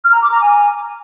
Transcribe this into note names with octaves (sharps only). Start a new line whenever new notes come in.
F6
A#5
D6
A#5
G#5